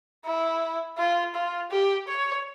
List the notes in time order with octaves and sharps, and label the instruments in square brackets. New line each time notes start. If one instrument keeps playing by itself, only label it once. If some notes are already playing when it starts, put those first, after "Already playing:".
[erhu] E4
F4
F4
G4
C#5